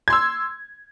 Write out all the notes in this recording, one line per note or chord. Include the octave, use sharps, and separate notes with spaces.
C6 E6 G#6